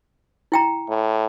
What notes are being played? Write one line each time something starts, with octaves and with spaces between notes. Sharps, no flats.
E4 G5 A#5
A2